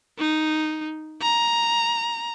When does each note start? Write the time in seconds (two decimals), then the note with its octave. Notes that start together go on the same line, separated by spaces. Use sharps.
0.19 D#4
1.22 A#5